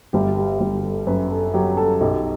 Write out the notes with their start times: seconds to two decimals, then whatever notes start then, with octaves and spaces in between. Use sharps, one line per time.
0.13 G1 G4
0.38 G4
0.60 G1 G4
0.84 A4
1.07 F#2 B4
1.31 A4
1.54 F#3 G4
1.77 A4
2.01 B1 G4